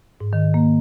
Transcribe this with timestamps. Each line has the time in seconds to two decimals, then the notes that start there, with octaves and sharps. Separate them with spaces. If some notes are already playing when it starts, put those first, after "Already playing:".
0.20 G#2
0.33 D#3
0.54 A#3